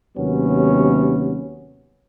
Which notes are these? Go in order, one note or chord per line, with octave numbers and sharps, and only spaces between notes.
D#2 C3 F#3 B3 C#4